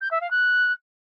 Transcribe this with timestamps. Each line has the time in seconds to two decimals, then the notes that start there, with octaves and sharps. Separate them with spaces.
0.01 G6
0.11 E5
0.21 F5
0.30 F#6